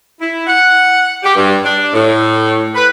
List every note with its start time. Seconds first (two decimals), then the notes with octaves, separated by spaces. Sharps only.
0.21 E4
0.47 F#5
1.23 G4
1.36 G2
1.64 D4
1.93 A2
2.75 B4